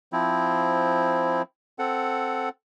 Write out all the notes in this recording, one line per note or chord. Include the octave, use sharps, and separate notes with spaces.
F3 C4 E4
C4 A4 F#5